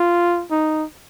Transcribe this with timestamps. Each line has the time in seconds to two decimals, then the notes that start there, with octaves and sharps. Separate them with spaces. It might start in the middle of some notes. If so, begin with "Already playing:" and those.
Already playing: F4
0.51 D#4